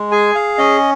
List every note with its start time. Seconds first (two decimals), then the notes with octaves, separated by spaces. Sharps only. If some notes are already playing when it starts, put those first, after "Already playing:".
Already playing: G#3
0.12 G#4 G#5
0.35 F5
0.58 C#4 D#5